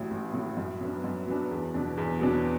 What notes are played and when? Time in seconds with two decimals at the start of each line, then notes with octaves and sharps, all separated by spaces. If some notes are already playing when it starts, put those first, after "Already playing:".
Already playing: A1 A2 F#3
0.11 A1
0.33 A2 F#3
0.57 F#2
0.80 F#3 B3 D4
1.04 F#2
1.27 F#3 B3 D4
1.51 E2
1.74 B2 F#3 D4
1.97 E2
2.21 B2 F#3 D4